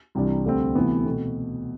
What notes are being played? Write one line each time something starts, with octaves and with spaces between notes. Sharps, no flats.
C2 C3 E3 G3 D4
D2 D3 G3 C4
D2 C3 E3 B3
B2 A3 C4